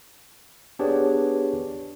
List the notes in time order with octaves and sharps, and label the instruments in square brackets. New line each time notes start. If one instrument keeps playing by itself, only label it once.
[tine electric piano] B3 D4 G4 G#4 B4 C#5